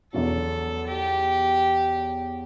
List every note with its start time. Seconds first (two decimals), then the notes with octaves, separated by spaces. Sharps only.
0.13 E2 B2 F#3 A4
0.88 G4